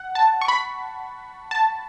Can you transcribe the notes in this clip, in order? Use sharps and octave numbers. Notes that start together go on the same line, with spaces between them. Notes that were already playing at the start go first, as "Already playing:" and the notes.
Already playing: F#5
A5
C#6
B5
A5